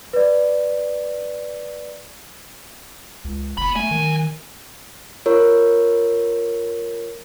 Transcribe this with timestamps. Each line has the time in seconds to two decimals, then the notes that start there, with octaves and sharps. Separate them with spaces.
0.13 B4 D5
3.25 C#2
3.57 F#1 B3 B5
3.76 F#3 A3 G#5
3.91 D#3
5.26 F4 A#4 C#5